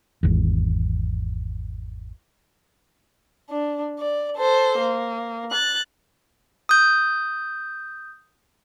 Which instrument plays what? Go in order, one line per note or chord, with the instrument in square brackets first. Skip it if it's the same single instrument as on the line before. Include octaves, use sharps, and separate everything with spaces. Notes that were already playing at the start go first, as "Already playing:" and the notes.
[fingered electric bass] G#1 E2
[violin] D4
D5
A4 C5
A#3
F#6 A6
[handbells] D#6 G6